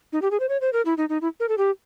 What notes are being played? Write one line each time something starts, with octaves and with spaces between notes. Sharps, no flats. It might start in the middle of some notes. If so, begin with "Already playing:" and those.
D#4
G4
G#4
C5
C#5
C5
A#4
E4
D#4
D#4
E4
A#4
A4
G4